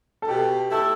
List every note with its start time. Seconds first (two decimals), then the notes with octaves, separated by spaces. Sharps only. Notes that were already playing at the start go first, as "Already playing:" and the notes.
0.22 A4
0.28 B2 G4
0.71 A3 E4 A4